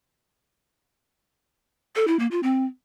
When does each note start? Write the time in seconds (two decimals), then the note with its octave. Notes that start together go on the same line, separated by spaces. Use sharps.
1.96 A4
2.08 E4
2.19 A#3
2.31 F4
2.43 C4